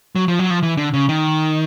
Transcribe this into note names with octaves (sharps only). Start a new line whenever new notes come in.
F#3
F3
F#3
F3
E3
D3
C#3
D#3